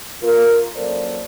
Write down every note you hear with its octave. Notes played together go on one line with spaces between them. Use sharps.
A#3 F4 A#4
F#2 A#3 A4 C5 D5